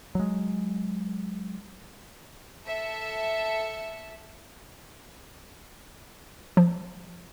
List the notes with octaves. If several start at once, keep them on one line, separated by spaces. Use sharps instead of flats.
F#3 G#3
A4 E5 C#7
F3